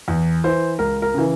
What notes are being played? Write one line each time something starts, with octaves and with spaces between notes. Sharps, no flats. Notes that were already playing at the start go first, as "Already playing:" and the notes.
E2
E3 C5
C#2 A#4
A#4
C#3 E3